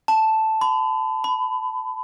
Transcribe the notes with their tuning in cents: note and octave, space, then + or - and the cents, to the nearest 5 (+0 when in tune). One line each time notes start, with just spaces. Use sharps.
A5 +0
B5 +35
B5 +20